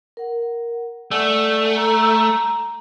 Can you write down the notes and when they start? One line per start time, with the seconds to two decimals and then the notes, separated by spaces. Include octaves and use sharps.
0.17 A#4 F#5
1.11 A3 D5 F#5 G#5
1.76 A#5